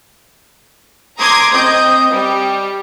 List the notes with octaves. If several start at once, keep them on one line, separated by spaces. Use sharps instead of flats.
A#5 C6 D6 D#6 G#6 A#6
C4 D#5 G6
G3